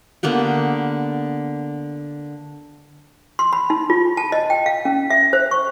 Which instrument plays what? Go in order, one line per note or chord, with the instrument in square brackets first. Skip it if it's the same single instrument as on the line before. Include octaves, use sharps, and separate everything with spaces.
[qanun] D3 A#3 B3 G4
[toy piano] C6
B5
D#4
F4
A5
D#5
G5
F5
C#4
E5
C5
C#6